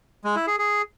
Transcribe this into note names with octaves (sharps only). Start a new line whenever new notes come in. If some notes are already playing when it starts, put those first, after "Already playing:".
G#3
E4
G#4
G#4